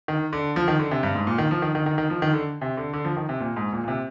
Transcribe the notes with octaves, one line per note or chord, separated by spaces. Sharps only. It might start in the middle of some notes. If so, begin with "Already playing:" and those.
D#3
D3
F3
D#3
D3
C3
G2
G#2
A#2
D#3
F3
D#3
D#3
D#3
D#3
F3
D#3
D3
C3
D3
D3
F3
D#3
C3
A#2
G#2
A#2
A#2
C3